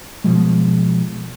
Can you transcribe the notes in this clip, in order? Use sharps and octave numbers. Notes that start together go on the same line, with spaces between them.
B2 F3 G#3